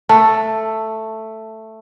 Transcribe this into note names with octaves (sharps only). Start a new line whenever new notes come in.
A3 A5